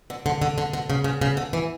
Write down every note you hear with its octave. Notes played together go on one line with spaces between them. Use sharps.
D3
D3
D3
D3
D3
C#3
C#3
C#3
D3
E3